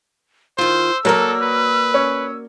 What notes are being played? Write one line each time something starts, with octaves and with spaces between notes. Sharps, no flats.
D#3 F4 C5 E6
F#3 A#3 F#4 A4 A#4 D5
B4
C#4